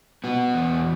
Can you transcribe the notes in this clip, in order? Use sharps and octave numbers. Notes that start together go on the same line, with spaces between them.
B3 F#4
E2